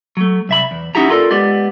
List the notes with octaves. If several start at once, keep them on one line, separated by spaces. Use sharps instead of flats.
F#3 A3
C2 E5 B5
E2
C#4 D#4 E4 F#4 G4 A#5
F4 A4 A#4 D5
G#3 B3 G4 D5